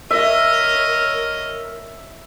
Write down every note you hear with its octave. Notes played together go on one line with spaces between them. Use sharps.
A#4 C#5 D#5 E5